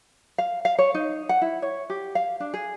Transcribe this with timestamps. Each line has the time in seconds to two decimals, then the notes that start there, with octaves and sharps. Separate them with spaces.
0.38 F5
0.65 F5
0.79 C#5
0.94 D#4
1.29 F#5
1.42 E4
1.62 C#5
1.90 G4
2.15 F5
2.40 D4
2.54 G#4